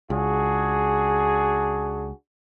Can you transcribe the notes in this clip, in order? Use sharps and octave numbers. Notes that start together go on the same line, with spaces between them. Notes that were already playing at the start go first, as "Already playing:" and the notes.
C#2 D4 F#4 G#4